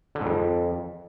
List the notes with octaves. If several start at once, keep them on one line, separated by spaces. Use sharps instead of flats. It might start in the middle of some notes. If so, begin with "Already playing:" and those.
D3
G#2
F2